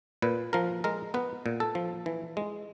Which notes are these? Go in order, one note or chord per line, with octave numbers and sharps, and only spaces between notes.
A#2 B4
F3 A#4
G#3 A#4
B3 B4
A#2
A4
F3
E3
G#3